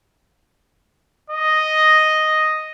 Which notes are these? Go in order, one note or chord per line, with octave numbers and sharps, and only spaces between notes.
D#5